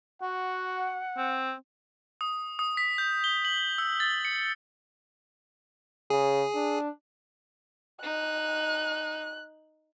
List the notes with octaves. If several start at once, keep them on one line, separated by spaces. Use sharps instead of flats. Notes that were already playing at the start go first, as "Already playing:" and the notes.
F#4 F#5
C4
D#6
D#6
B6
G6
G7
F#7
E6
A6
C#7
C#3 G#4
D4
D#4 F#6